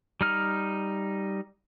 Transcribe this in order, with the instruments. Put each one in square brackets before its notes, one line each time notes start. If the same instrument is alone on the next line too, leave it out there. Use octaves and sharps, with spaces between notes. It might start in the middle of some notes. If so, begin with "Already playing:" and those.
[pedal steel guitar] G3 D#4 F6